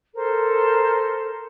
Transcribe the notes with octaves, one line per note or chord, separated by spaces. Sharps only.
A4 A#4 C5